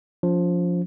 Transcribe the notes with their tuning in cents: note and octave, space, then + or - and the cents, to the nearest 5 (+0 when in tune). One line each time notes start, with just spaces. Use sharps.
F3 +10 C#4 +40